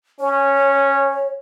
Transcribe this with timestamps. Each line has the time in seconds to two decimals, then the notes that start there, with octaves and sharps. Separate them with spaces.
0.20 C#4 C#5